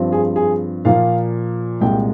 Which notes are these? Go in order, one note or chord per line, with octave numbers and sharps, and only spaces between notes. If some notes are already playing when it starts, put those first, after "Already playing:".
Already playing: G2 F3 C4
G#4
G#4
A#2 F3 A#3 F5
C2 A#2 G#3 G5